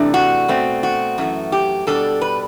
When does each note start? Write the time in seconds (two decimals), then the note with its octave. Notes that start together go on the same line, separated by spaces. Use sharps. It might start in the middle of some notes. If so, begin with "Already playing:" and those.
Already playing: C3 E3 A3 D4
0.14 F#4
0.48 B2 A3 C4
0.83 F#4
1.18 F#2 E3 A3
1.52 G4
1.87 B2 G3 D4 A4
2.21 B4